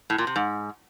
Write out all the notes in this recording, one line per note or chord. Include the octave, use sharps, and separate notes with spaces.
A2
A#2
C3
G#2